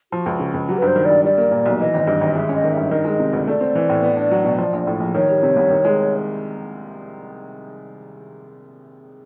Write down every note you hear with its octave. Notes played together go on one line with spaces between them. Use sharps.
F3 F#4
C#2
C#3
C#2
F#3 G4
B4
G2 C5
D#3
D5
G2
G3 D5
A#3
A#2
B1
E3 D#5
G#1
G2
G#1
G#3 E5
C#4
D#5
D#3
E5
G2
D#3 D#5
G#3
C3
D2
A3 D5
C4
E3
A2
B3
D4
F#3
B2
F3
A#1
A2
A#1
D#3 C#5
G3
C3
C2
D#3
G#3